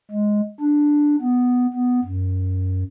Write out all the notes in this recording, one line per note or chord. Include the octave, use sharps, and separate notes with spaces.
G#3
D4
B3
B3
F#2